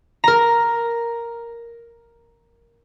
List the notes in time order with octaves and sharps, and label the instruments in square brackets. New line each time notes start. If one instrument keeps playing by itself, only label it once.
[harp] A#4 A#5